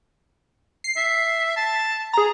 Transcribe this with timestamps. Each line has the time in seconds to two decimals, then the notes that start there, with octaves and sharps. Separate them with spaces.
0.84 C7
0.97 E5
1.56 A5
2.13 G#4 A#5